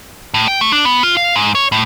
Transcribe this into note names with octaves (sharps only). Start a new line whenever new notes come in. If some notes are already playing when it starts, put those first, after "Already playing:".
A2
G5
A3
D4
B3
F4
F5
G#2
C#5
A2